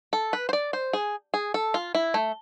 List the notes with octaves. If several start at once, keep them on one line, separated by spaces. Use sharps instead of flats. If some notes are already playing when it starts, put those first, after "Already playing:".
A4
B4
C5
D5
C5
G#4
G#4
A4
F4
E4
A3